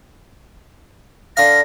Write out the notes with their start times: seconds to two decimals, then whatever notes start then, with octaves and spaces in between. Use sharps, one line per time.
1.37 D3 F5 A#6